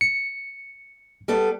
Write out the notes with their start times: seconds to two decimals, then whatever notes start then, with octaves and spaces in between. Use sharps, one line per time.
0.01 C#7
1.28 G3 B3 A4